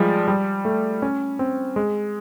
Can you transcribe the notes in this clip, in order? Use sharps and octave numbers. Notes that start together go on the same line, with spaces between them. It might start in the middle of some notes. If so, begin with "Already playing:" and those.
Already playing: F3 G3 G#3
G3
A3
C#4
C4
G#3